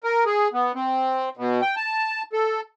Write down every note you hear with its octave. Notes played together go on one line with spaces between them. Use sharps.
A#4
G#4
B3
C4
B2
G5
A5
A4